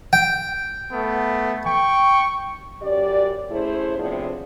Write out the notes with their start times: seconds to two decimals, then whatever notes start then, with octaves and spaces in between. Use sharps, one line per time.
0.13 G5
0.92 A3 B3
1.66 G5 C#6
2.82 F#2 G4 D5
3.51 A3 C#4 E4 G#4 C5
3.98 A2 C3 F3 B3 D4 G#4